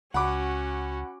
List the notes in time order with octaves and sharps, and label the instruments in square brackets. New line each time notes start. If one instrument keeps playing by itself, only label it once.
[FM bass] C#2 [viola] C#4 F#4 [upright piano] F#5 B5 D6